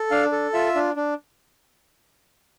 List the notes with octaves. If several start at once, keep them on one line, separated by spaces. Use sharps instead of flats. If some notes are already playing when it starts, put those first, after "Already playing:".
Already playing: A4
D4 F5
A4
F4 E5
D4
D4